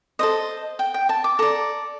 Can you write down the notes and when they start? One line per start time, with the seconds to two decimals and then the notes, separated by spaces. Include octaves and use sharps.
0.19 A4 C5 D#5
0.79 G5
0.94 G5
1.09 A5
1.24 D6
1.39 A4 D5 A#5